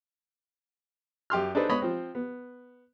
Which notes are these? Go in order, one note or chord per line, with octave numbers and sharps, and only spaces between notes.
F#2 G4 C6 F6
D4 D#4 G#4 A4 B4 C5
G#3 B3 C#5 D#5 B5
F3 C4
B3